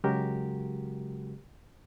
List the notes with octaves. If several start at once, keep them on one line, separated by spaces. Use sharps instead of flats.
C#3 F#3 G#3 F#4 G4 A#4